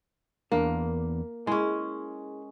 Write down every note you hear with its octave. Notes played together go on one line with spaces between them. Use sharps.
E2 A#3 D4 A#4
G#3 C#4 E4 G#4 C6